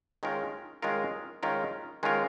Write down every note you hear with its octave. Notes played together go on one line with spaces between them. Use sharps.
D#3 G#3 C#4 F4 A#4
D#3 G#3 C#4 F4 A#4
D#3 G#3 C#4 F4 A#4
D#3 G#3 C#4 F4 A#4